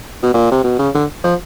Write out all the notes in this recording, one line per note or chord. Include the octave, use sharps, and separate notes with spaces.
B2
A#2
C3
B2
C#3
D3
F3